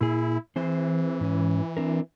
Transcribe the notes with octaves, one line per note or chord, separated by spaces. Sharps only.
A#2 E4 G#4
E3 C4 G#4 C5
G#2 C#4
C4 D4 A#4